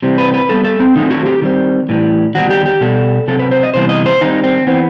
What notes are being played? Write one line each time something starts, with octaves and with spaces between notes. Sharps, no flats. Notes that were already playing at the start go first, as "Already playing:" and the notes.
C3 E3 G3 C4
B4
B4
A2 G3 B3 A4
A4
C4
D#3 F#3 A3 C4 D#4
F#4
G4
D#3 G3 C4
A2 E3 G3
D#3 G3 B3 F#4
G4
G4
B2 G3 B3 A4
C3 F#3 C4 A4
B4
C5
D#5
C3 E3 G3 B3 C5
D#5
C5
D#3 G3 C4 D#4
C4
E3 B3 C4